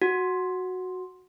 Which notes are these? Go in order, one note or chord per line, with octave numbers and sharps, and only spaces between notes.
F#4